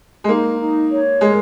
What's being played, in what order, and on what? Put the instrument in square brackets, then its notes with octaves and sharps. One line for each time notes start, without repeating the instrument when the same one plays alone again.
[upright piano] G#3
[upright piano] A#3 [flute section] D#4
[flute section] D#4
C#5
[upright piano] G#3 [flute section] A#4